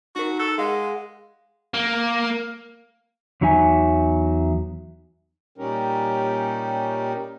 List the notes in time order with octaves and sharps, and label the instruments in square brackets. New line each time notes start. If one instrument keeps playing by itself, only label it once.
[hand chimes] D#4 A#4 [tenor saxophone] F#4
[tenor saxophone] A4 [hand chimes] F#6
[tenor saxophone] G#3 [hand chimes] G#4 F5 F#5
[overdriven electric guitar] A#3
[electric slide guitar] E2 F#3 D#4 E5 G#5
[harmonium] A#2 G3 C#4 D#4 G4 A#4